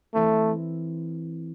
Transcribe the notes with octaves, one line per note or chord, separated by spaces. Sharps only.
E3 A3 C4 E4 A4